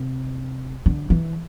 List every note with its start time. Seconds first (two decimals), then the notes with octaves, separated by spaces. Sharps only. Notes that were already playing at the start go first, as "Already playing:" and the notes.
Already playing: C3
0.86 D3
1.10 E3